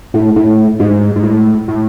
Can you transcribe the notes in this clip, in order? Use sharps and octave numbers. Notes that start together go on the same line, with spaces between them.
A2
A2
G#2
G#2
A2
A2